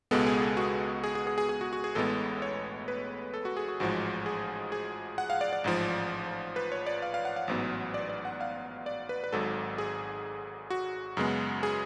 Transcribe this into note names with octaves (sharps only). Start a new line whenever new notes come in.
C#2 B2 G#3 B3 A4
G#4
A4
F#4
G#4
G#4
G#4
G#4
G#4
F#4
F#4
G#4
A1 A2 G#3 B3 A4
C#5
B4
A4
F#4
G#4
F#4
A1 G#2 F3 G#3 F#4
G#4
G#4
F#5
F5
D5
D5
A1 G#2 F3
B4
C#5
D5
F5
F5
F#5
F5
A1 G#2 F#3 B3
D5
D5
F#5
F5
D5
B4
B4
G#1 G#2 F#3 A4
G#4
F#4
F#2 C#3 G#3 B3
G#4